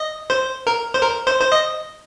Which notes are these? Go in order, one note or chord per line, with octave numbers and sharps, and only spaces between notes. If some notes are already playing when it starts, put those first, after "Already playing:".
Already playing: D#5
C5
A#4
C5
A#4
C5
C5
D#5